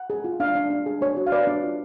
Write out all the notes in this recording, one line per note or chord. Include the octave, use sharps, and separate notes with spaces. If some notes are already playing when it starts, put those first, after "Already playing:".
Already playing: F#5
G#4
F4
D4 F5
D4
D4
G#4
D4 C#5
F#4
F5
B4 D5
D4
F4